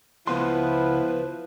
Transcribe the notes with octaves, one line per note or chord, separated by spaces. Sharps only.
C#2 F3 B3 E4 B4 C6